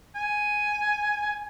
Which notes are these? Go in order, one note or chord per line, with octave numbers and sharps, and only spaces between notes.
G#5